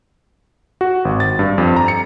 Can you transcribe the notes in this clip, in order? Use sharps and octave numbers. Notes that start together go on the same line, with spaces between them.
F#4
G#1
A6
G2
F2
A#5
C#7